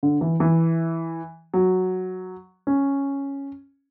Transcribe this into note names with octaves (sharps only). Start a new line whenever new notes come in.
D3
E3
E3
F#3
C#4